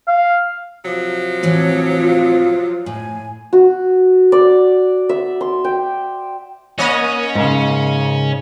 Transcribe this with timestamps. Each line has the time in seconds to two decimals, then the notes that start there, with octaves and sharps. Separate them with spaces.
0.08 F5
0.84 C3 F3 F#3
1.43 A2 E3 C4 C#5
2.00 F4
2.86 A2 G#5
3.53 F#4
4.32 D5
5.09 E5
5.41 C6
5.64 G5
6.78 A#3 C#4 C#5 D#5
7.35 G#2 C#3